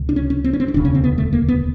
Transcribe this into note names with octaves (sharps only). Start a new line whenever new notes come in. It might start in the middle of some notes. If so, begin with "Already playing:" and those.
Already playing: C#2 C3
D4
C#4
C#4
C4
C#4
C4
C#4
E1 D2 C#3 D4
C#4
C4
B3
A3
A#3
B3